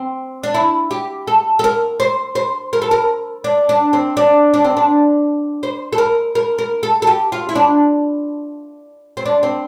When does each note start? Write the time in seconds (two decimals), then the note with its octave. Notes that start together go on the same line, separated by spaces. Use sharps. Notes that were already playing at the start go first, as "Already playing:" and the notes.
Already playing: C4
0.43 D4
0.54 E4
0.91 G4
1.27 A4
1.59 A4
1.64 A#4
2.00 C5
2.35 C5
2.73 A#4
2.82 A4
2.91 A#4
3.44 D4
3.69 D4
3.93 C4
4.17 D4
4.54 D4
4.65 C4
4.77 D4
5.63 C5
5.93 A4
5.98 A#4
6.35 A#4
6.58 A#4
6.83 A4
7.02 A4
7.07 G4
7.32 F4
7.49 E4
7.55 D4
9.17 C4
9.26 D4
9.43 C4